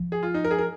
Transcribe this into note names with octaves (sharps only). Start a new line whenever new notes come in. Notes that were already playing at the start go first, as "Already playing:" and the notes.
Already playing: F3
G#4
F4
D#4
A#4
G#4
A#4